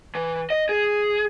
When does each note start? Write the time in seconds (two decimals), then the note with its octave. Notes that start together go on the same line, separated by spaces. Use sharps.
0.15 E3
0.50 D#5
0.69 G#4